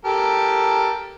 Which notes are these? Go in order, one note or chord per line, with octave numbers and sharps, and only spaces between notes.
G4 A4 A#4